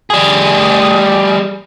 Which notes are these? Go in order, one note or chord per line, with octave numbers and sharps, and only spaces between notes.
G3 G#4